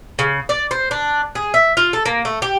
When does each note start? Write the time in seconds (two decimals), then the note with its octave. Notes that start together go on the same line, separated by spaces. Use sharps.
0.19 C#3
0.49 D5
0.71 C5
0.91 D4
1.35 G#4
1.54 E5
1.77 F4
1.93 A4
2.06 A#3
2.25 A3
2.42 G4